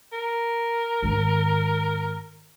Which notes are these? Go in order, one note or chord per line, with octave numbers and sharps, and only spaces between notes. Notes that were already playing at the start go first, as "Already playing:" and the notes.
A#4
G#2 D#3